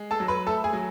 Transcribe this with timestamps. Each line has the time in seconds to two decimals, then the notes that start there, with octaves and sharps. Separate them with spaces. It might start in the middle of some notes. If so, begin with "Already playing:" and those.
Already playing: G#3
0.11 A4 A5
0.20 F#3
0.28 B4 B5
0.46 A3 A4 A5
0.64 G#4 G#5
0.73 F#3